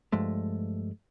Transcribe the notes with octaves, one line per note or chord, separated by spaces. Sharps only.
G2 F3 G#3 A3